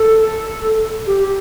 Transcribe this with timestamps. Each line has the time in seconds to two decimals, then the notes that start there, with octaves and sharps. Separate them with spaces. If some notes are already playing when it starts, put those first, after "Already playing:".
Already playing: A4
1.07 G4